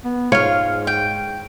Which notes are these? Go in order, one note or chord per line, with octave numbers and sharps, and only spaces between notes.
B3
G#2 F4 C#5 F5
G5